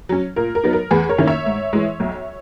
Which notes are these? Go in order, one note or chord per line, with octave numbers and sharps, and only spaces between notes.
F#3 C#4
A#2 A#4
A#4
F#3 B3 D#4
A#4
E2 G#4 B4
A#4 C#5
D#3 A#3 C#4 E4
C#5 E5
G#2
E3 G#3
B1